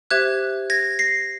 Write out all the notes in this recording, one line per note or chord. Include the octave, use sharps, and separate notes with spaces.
G4 C5 E5 F#6 G#6
G#6 A#6
A#6 C7